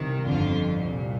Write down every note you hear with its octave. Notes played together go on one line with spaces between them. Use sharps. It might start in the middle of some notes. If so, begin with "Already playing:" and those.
Already playing: C2 C3 D#3
G1 F2 D3 F4
C2 A#2